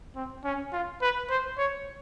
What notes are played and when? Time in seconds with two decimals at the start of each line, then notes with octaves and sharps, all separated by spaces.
0.16 C4
0.44 C#4
0.72 F4
1.01 B4
1.30 C5
1.58 C#5